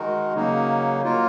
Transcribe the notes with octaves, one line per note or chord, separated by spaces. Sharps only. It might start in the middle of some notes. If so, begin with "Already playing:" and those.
Already playing: D#3 G#3 D#4 F#4 A#4
C#3 F#3 A#3 D#4
F#3 A#3 F4 A#4